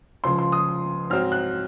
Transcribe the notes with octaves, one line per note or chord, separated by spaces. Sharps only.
C#2 C#3 F3 C6
C6
D#6
G#2 F#3 C4 F6
F#6